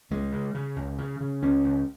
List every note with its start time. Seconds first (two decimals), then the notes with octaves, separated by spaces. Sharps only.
0.11 C#2 G#3
0.32 C#3
0.55 C#3
0.76 C#2
0.98 C#3
1.21 C#3
1.42 C#2 C#4
1.64 C#2